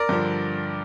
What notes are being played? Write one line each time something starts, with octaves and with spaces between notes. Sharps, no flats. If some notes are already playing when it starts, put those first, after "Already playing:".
Already playing: A#4 D5
G2 D3 F3